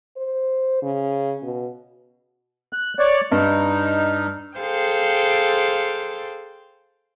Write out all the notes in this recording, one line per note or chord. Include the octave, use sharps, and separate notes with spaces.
C5
C#3
B2
F#6
C#5 D5
G2 D#4
G#4 A4 C5 F5 G5